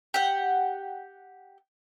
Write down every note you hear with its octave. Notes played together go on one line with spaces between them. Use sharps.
G4 F#5